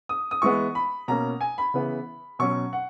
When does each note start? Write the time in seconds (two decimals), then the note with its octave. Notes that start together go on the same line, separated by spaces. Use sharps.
0.09 D#6
0.31 D#6
0.42 E3 G#3 B3 C#6
0.75 B5
1.08 B2 A#3 C#4 A#5
1.41 G#5
1.58 B5
1.74 C#3 E3 B3
2.39 B2 F#3 C#4 C#6
2.73 F#5